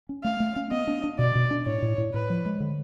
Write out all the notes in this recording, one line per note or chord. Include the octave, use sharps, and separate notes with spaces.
C#4
A3 F5
A3
C#4
B3 D#5
D4
D4
B2 D5
B2
D4
A2 C#5
A2
A2
A2 B4
F3
G#3
D3